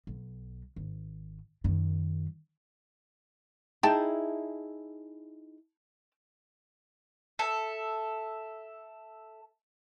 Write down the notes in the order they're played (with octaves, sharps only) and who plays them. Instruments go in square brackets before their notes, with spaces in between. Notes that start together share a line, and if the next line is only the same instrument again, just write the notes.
[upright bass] B1
G#1
F#2 D#3
[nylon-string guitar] D#4 E4 G#4 [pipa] G5 A5
[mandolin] A4 E5